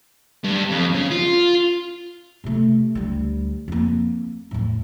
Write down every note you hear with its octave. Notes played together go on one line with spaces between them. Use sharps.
G2
F2
C#3
F4
C3 A3
D2 G3
F2 A#3
E2 A2